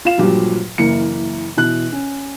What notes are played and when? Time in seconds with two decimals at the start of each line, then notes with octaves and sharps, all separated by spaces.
0.05 F4 F5 E7
0.18 G2 A#2 F3 F#3 F4 G4
0.78 F#1 E3 A#3 C#7
1.57 B2 E3 F#6
1.92 C#4